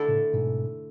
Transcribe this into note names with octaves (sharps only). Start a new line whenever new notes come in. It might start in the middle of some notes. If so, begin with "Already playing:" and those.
Already playing: D3 A3 E4 A4
A2 C#3
G#2 B2